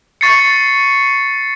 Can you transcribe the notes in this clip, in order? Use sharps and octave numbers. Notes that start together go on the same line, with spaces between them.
C#6 A6 C7 C#7